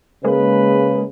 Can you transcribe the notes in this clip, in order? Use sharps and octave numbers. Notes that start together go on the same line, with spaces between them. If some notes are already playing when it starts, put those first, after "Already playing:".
C#3 G#3 A#3 B4